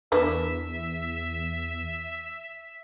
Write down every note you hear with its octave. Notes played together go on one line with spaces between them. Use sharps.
E2 D4 A#4 B4 E5